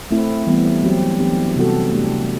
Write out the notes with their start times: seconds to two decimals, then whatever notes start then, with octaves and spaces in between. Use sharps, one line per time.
0.11 A3 C4 E4
0.47 E3 G3 B3
0.84 F#3 C4 G4
1.19 E3 B3 D4 G4
1.56 C3 G3 B3 F#4 A4
1.92 A3 D4 G4